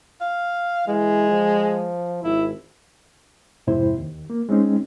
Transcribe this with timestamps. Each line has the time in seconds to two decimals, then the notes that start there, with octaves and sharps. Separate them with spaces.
0.21 F5
0.87 E3 G#3
1.30 F3
2.24 G#1 E4
3.67 F2 G#2 C3 E4 C5
3.97 D#2
4.30 A#3
4.49 G#3 C4 C#4 D#4